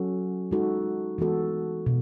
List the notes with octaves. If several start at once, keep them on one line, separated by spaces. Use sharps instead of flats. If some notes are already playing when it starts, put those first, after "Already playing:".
Already playing: F#3 C#4 F#4 A4
G#3 D#4 F#4 A4
E3 G#3 B3 F#4 A4
B2